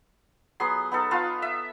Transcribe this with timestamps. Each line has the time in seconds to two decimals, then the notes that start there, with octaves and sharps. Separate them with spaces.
0.60 F#3 B3 G#4 C6
0.92 B3 D#4 A4
1.11 B3 F4 F5 A5
1.42 E5